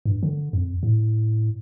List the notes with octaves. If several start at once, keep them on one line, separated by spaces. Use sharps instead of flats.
G2
D3
F2
A2